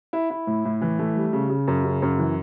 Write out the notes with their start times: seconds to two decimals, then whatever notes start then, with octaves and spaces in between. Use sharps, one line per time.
0.13 E4
0.30 E4
0.47 A2
0.65 A2
0.82 E3
0.99 A3
1.16 G3
1.33 C#3
1.50 C#3
1.68 F#2
1.84 C#3
2.02 F#2
2.19 E3